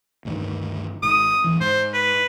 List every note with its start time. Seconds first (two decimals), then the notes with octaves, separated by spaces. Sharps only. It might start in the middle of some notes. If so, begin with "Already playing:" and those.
0.25 D2 G2 D#3
1.02 G#1 D#6
1.44 D1 E3
1.60 G#2 C5
1.94 B4